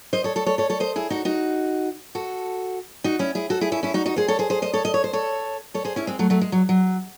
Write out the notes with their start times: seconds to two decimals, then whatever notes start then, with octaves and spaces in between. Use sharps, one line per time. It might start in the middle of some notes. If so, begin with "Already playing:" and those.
0.13 C5 D#5
0.24 A4 C#5
0.36 A4 C#5
0.46 A4 C#5
0.58 A4 C#5
0.70 A4 C#5
0.80 C5 D#5
0.96 E4 G#4
1.10 D#4 F#4
1.25 D#4 F#4
2.15 F#4 A4
3.04 D#4 F#4
3.19 C#4 E4
3.35 E4 G#4
3.50 F#4 A4
3.61 E4 G#4
3.72 C#4 E4
3.83 C#4 E4
3.94 D#4 F#4
4.06 D#4 F#4
4.16 G#4 C5
4.28 A4 C#5
4.39 G#4 C5
4.50 G#4 C5
4.62 C5 D#5
4.73 A4 C#5
4.85 D#5
4.94 C#5
5.04 C5
5.13 A4 C#5
5.74 A4 C#5
5.85 G#4 C5
5.96 C#4 E4
6.07 G#3 C4
6.19 F#3 A3
6.30 F#3 A3
6.41 G#3
6.52 F#3
6.69 F#3